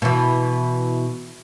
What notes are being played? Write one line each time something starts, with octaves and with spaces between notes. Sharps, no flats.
B2 E3